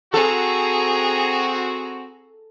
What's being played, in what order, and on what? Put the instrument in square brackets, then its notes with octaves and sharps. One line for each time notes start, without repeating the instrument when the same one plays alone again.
[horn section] C4 F#4 [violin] G#4 A#5 [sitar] A4